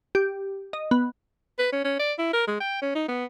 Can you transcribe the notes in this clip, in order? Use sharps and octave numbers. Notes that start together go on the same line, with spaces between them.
G4
D#5
B3
B4
C#4
C#4
D5
E4
A#4
G#3
G5
C#4
D#4
B3